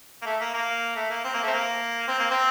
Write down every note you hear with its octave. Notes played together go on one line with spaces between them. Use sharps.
A#3
A3
A#3
A#3
A3
A#3
C4
A#3
A3 C4
A#3
C4
A#3
C4